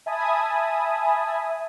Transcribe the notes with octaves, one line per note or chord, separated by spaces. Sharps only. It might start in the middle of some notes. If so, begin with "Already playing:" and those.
E5 G#5 A5 B5 D#6